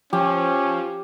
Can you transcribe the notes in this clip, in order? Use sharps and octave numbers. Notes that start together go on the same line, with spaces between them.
F3 C#4 G4